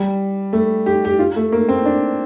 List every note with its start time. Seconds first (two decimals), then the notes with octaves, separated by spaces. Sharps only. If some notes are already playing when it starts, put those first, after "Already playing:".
Already playing: G3
0.53 A3
0.86 G4
1.05 G4
1.19 F4
1.36 A3
1.52 A#3
1.69 C4
1.85 D4